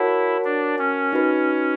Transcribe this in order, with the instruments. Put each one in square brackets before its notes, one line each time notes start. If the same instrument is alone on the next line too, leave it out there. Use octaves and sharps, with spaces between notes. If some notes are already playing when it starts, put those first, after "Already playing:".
Already playing: [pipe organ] E4 [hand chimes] F#4 A#4 C#5 F#5 A5
[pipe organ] D4
C#4
[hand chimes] D#4 F#4 B4